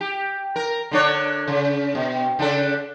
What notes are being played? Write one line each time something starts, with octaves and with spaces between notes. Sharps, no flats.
G4
A#4
D3 D4 C#5
C#3
B2
C#3 D4 A4